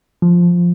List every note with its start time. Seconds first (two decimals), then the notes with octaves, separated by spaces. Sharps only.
0.22 F3